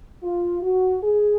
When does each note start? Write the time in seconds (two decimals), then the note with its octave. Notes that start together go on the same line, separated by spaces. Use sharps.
0.23 F4
0.63 F#4
1.03 G#4